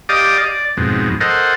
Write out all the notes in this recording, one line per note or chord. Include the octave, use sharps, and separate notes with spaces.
G4 D5 D#5 F5 D6 D#6
D5
F2 G#2 B2
A4 A#4 C5 D#5 F#5